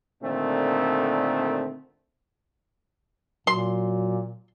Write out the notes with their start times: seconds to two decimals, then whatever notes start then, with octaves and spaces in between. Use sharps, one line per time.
0.23 A#2 D3 D#3 A3 C4
3.47 A#2 F#3 C6